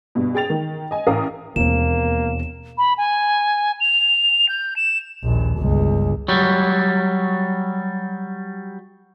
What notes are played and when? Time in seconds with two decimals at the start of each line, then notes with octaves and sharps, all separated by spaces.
0.15 G2 B2
0.35 G#4 G5 A6 F7
0.50 D#3
0.91 D#5 G#5
1.07 A1 A#4 F5 D#6
1.56 E1 D#2 A#3 C4 E4 E7
2.78 B5
2.98 G#5
3.80 F7
4.49 G6
4.76 E7
5.23 A#1 D#2
5.58 G1 C#2
6.28 F#3 G3